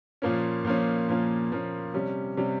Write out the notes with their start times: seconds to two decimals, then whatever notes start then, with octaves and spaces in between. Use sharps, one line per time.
0.22 A#2 F3 A#3 C#4
0.65 A#2 F3 A#3 C#4
1.08 A#2 F3 A#3 C#4
1.51 A#2 F3 A#3 C#4
1.94 C3 G3 C#4
2.37 C3 G3 C#4